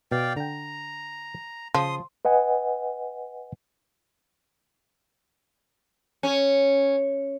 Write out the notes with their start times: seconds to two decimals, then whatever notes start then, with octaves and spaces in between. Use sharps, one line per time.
0.12 B2 D5 F5 G5
0.36 D3 G5 A#5
1.75 C#3 F3 C6 D#6
2.25 B4 D#5 F#5 G#5
6.23 C#4